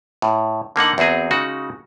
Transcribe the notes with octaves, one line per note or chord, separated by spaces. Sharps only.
A2
D3 A#3 D#4 F#5
E2 C4 F#4 G#4 C5
C#3 G#3 D#4 F#4